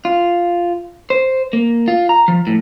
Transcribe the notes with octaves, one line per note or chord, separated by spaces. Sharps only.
F4
C5
A#3
F4
A#5
F3
A2